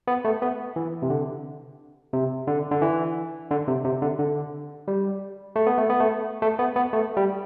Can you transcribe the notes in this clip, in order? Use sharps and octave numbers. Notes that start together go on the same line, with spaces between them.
B3
A3
B3
E3
C3
D3
C3
D3
D3
E3
D3
C3
C3
D3
D3
G3
A3
B3
A3
B3
A3
A3
B3
B3
A3
G3